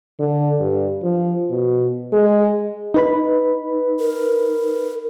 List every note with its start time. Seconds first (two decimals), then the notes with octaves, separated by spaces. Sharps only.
0.19 D3
0.60 G2
1.03 F3
1.50 B2
2.13 G#3
2.94 D#4 B4 B5
4.00 A#4